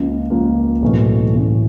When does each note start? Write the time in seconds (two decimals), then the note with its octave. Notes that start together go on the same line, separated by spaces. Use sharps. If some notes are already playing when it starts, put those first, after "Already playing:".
Already playing: C#2 C#3 F3 A#3
0.30 C#2 C#3 F3 A#3
0.82 B1 A2 E3 A3 C#4
1.34 B1 A2 E3 A3 C#4